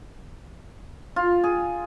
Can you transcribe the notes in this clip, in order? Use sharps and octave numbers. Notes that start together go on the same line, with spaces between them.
F4
G#4